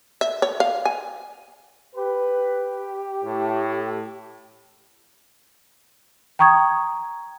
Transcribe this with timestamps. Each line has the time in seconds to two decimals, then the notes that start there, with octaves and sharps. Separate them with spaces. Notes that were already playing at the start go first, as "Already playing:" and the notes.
0.21 E5
0.42 C#5
0.60 F5
0.85 G#5
1.96 G4 B4
3.25 A2
6.39 G5 A#5 C#6 D#6 G#6